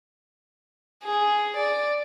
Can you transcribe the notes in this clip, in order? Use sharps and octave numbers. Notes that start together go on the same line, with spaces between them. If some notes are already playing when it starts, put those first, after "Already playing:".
G#4
D5